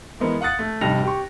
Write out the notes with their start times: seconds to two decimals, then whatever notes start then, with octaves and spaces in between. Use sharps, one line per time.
0.20 E3 G#3 B3 A#4
0.41 F5 F#5 D#6 F#6 A6 C#7
0.59 A3
0.81 F1 G2 G3 D#4 A#6 F7
1.03 G4 C#6